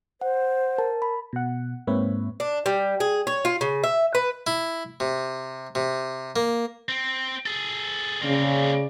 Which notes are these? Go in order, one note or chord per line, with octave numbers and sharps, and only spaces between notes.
C5 F#5
A#4 A5
B5
B2 F#5
G#2 A#3 C4 B4 C#5 E5
D4
G3
G#4
C#5
F4
C#3
E5
B4
E4
C3
C3
A#3
C4
G#4 A4
C#3 A#3 C4 D5